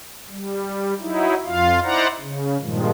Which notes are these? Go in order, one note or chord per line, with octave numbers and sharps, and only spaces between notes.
G3
F#3 D#4 E4
F2 F4 F5
D#4 E4 C5 D5 F#5 A#5
C#3
G2 A#2 D#3 F3 G#3